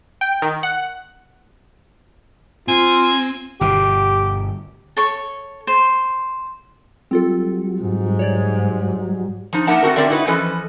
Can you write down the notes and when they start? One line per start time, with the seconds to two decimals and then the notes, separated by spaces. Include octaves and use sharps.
0.21 G5
0.42 D#3
0.63 F#5
2.68 C4 F4 G#5
3.61 G1 B2 G4
4.97 A4 C#5 C#6
5.67 C5
7.11 F#3 G3 C4 F4 A4
7.81 G#2
8.19 C#5 D5 G#6
9.53 F3 D#4
9.67 A#3 D#4 A#4 E5 F#5 A5
9.82 A3 C4 F#4 A#4
9.96 D3 C4 A#4 D5 E5
10.10 D#4 E4 F#4 B4
10.26 E3 F3 C#4 A4 B4 D#5